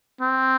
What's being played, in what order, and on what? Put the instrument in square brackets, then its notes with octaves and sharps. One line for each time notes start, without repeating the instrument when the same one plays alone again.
[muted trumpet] C4